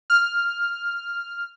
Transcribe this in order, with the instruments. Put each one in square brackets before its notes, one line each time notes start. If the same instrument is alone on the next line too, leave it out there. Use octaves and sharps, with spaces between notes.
[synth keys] F6